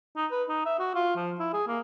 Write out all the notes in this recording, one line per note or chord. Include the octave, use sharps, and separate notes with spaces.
D#4
B4
D#4
E5
F#4
F4
F3
E4
G#4
A#3